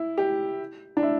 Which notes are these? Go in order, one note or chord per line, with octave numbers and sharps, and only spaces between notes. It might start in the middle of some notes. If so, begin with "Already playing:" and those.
Already playing: E4
G4
D4
E4